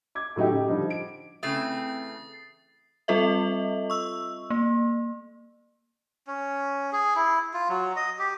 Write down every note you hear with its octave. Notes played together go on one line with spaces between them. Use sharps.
D6 G#6
A2 F#3 D#4 E4 G4
C#3 G4
D3 F3 G3 D#4
D7
C#3 E3 A3 C4 D#6 A6 C7
G3 C4 F4 A4 D#5 E5
C#6 E6
A#3
C#4
G#4
E4
F4
F#3
D#5
G4